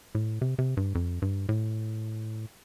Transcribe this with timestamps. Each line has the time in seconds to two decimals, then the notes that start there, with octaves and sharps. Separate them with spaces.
0.15 A2
0.42 C3
0.59 C3
0.77 G2
0.95 F2
1.22 G2
1.49 A2